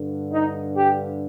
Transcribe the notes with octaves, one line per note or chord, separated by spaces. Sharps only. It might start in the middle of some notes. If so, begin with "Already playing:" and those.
Already playing: G2 D3
D#4
G4